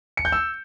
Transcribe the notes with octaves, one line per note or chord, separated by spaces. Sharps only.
C#7
G6
E6